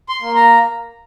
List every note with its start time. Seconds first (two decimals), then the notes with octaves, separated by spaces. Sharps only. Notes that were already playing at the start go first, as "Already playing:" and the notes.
0.09 C6
0.22 A#3
0.36 A#5